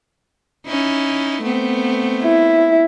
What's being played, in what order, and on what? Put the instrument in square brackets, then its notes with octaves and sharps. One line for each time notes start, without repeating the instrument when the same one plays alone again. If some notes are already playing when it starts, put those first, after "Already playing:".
[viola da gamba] C#4 D#4 E4
A3 B3 C4
[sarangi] E4